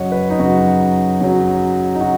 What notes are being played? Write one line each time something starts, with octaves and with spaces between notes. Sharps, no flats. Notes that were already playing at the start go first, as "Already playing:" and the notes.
Already playing: F#2 C#3 F#3 C#5 D#5 F#5
B4
D#4
F#2 C#3 F#3 F#4
F#2 C#3 F#3
D#4
C#3 F#4